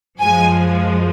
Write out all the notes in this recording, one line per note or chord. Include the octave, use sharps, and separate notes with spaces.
F#2 F3 G#3 G#5